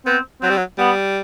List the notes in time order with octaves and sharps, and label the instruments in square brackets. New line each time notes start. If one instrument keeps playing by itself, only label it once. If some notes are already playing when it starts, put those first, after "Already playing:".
[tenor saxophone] B3 [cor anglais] C4
[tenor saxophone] F#3 [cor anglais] C4
[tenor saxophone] G3
F#3
[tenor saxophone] G3 [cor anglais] B3